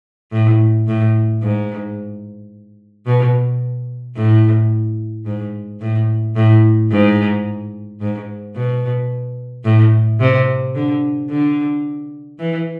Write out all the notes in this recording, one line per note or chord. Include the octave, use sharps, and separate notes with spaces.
A2
A2
G#2
B2
A2
G#2
A2
A2
G#2
G#2
B2
A2
C3
D3
D3
E3